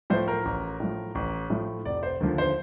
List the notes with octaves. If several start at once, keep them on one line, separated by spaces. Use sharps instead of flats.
A2 F3 C5
A#4
A1
A2 F3
A1
A2 F3
F1 D5
C5
D#2 D3 F3
C5